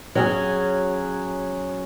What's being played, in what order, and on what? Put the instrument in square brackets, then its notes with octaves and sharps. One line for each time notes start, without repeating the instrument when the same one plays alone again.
[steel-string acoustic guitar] F#3 C#4 G#4